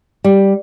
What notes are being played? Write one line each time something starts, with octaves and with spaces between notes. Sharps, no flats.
G3